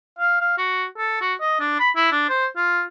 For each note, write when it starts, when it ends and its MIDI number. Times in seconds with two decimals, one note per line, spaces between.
0.18 0.37 77
0.40 0.54 77
0.58 0.85 66
0.97 1.19 69
1.21 1.33 66
1.40 1.57 75
1.60 1.75 62
1.79 1.90 83
1.96 2.11 64
2.12 2.24 62
2.29 2.46 72
2.57 2.82 65